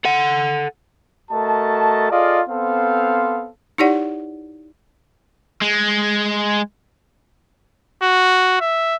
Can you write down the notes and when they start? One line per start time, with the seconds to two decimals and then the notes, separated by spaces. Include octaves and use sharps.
0.05 A4 F#5
1.32 A3 F#4 A#4 D#5 A5
2.11 F4 G#4 A4 D5 D#5 F5
2.48 B3 C4 A4 C5 F5
3.78 D#4 E4 G4 C#5 D5 F#5
5.62 G#3
8.03 F#4
8.61 E5